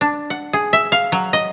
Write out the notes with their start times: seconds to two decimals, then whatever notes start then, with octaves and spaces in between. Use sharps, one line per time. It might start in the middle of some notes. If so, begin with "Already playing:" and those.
0.01 D4
0.30 F#5
0.53 G#4
0.73 E5
0.92 F5
1.12 F#3
1.33 D#5